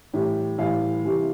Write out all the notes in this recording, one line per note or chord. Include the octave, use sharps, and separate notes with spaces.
A2 E3 G3 G4
A2 E3 G3 F5
C3 E3 G3